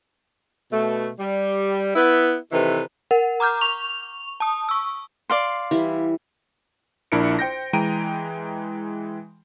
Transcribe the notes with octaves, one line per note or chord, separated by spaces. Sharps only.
B2 A3
G3
B3 E4
C3 D#3 E3 A4 B4
A#4 F#5
A#5 D6 F6 G6
C#6 F7
A5 D#6
C#6 E6
D5 F5 C6
E3 G3 E4
A#1 D4 E4 A#4 C#7 D7
C5 G5 G6 A#6
E3 G#3 G5 A#5 D7 D#7